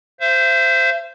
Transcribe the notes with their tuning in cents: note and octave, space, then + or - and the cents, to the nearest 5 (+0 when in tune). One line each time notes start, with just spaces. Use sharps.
C5 -5 E5 +45